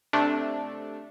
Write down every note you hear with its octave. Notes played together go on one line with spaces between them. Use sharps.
C3 A3 D4